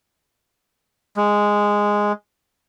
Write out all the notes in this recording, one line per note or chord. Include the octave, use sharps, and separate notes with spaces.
G#3